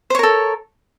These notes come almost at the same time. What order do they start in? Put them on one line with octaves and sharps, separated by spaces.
C5 C#5 A#4 A4